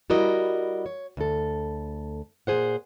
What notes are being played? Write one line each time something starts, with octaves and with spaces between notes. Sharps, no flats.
G3 E4 F#4 A#4 D#5
C#5
D2 A4
A#2 F3 G#4 C5 F#5